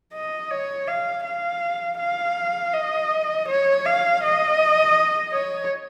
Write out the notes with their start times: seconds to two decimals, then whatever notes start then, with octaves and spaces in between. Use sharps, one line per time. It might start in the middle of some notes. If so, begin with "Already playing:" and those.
0.13 D#5
0.51 C#5
0.88 F5
1.24 F5
1.98 F5
2.73 D#5
3.48 C#5
3.85 F5
4.22 D#5
5.33 C#5